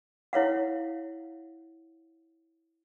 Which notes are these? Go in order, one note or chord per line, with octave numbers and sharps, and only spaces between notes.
E4 C#5 F5 F#5